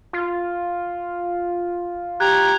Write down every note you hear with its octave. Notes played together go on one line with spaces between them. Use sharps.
F4
G4 A#5 F#6 G#6